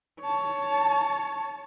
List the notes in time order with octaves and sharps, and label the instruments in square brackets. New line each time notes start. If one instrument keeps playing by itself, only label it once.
[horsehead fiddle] C#5 A5